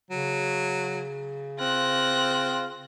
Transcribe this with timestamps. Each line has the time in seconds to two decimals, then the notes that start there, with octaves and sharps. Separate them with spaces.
0.11 C#3 F#3
1.60 C4 F4 F#6 A#6